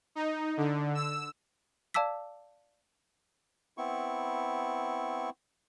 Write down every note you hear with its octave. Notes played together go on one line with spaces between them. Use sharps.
D#4
D3
E6
D5 F5 A5 D6 E6 B6
B3 C4 E4 C#6